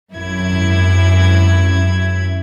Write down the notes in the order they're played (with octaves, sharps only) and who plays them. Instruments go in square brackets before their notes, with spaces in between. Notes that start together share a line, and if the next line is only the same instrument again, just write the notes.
[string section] G#1 F#2 E4 G#6